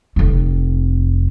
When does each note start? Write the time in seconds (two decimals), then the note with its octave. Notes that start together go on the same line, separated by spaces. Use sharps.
0.16 F1 C4